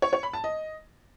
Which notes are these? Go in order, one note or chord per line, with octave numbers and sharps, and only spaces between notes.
C#5
C#5
B5
A5
D#5